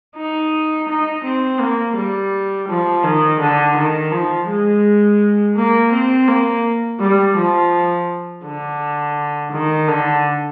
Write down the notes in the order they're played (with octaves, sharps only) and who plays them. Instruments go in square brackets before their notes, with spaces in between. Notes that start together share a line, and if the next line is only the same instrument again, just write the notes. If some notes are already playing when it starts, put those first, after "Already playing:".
[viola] D#4
D#4
C4
A#3
G3
F3
D#3
D3
D#3
F3
G#3
A#3
C4
A#3
G3
F3
D3
D#3
D3